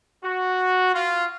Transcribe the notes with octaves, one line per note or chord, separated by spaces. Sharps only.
F#4
F4